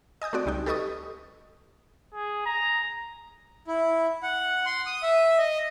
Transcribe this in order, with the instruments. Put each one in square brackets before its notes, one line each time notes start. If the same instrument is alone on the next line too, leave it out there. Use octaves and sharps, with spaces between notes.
[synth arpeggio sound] D#5 G#5 D#6 G6
A3 C4 F#4 D5
C#2 G3 D#4 G5
G4 A4 B4 D#5 C#6 D#6
[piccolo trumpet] G#4
A#5
[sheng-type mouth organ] E4
F#5
C6
D#6
E5
D#5